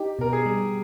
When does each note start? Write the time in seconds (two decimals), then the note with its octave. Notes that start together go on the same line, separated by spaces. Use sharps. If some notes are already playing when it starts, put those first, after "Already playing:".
Already playing: D#4 G4
0.19 B2 A#4
0.33 G#4
0.46 G3